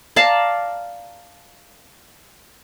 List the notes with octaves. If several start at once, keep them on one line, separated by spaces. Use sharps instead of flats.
D5 F5 A5 A#5